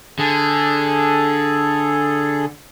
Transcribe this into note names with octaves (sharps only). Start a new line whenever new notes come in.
D3 G#4 A4